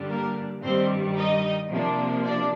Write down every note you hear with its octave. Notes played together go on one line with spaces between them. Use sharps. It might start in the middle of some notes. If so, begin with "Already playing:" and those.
Already playing: G2 D3 G3 D4
A#3 A#4
G2 D#3 G3 C4 C5
D#4 D#5
C3 F3 A#3 D4
D4 D5